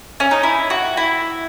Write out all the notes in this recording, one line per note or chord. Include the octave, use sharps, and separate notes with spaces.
C#4
D#4
E4
F#4
E4